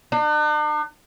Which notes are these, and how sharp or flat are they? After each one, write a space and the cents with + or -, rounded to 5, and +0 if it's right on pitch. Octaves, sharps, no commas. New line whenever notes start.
D4 +45